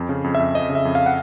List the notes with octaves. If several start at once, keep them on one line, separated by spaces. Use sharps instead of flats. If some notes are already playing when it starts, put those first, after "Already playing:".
Already playing: F2
C#3
F2
E5
F2
F2 D#5
C#3
E5
F2
F5
F#5